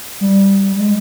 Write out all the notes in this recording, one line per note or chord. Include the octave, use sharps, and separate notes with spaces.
G3
G3
G#3